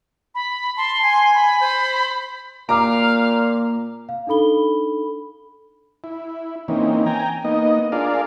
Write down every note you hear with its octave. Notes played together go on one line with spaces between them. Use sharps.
B5
A5 C6
G#5
B5
C5
A#2 A#3 F5 A#5 D6
F5
D4 D#4 A4 B5 G7
E4
E3 A#3 C4 C#4 D#4
G5 G#5 A#5
A#3 B3 D#4 D#5
D4 F4 G#4 A#4 D5 F5